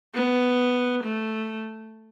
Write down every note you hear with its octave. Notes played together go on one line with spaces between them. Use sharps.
B3
A3